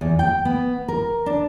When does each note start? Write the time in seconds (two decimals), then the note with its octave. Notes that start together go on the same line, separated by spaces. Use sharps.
0.01 E2
0.19 G5
0.45 B3
0.88 A#4
1.26 D4